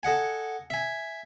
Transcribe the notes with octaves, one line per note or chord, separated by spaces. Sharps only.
A4 D#5 F#5 G#5
E5 G#5